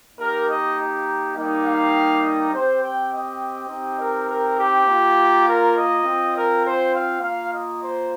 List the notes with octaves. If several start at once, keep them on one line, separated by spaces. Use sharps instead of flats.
A#3 D#4 G4 A#4
D#5
G3 A#3 D#4 G4
F5
D#5
C4 G4 C5
G5
D#5
C4 D#4 G4
A#4
A#4
G4
A#3 F4
A#4
D#5
C4 F4
A#4
C5
F5
A#3 F4 F5
D#5
C5